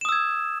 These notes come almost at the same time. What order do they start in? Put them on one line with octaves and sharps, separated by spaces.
E7 D#6 E6 G#6